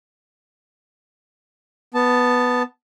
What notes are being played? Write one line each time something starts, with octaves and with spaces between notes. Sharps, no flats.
B3 A5